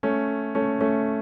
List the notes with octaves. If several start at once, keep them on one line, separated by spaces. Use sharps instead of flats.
A3 C#4
A3 C#4
A3 C#4